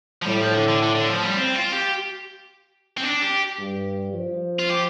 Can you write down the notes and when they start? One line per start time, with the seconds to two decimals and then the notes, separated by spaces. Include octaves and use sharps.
0.22 F3
0.26 A2 G3
0.40 F3
0.54 D3
0.68 D3
0.82 D3
0.95 D3
1.10 F3
1.23 G3
1.36 C4
1.55 F4
1.73 G4
2.97 C4
3.03 D4
3.22 G4
3.59 G2
4.13 F3
4.59 F4
4.69 G4